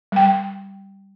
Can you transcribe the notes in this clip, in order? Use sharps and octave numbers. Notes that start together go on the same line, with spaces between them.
G3 G5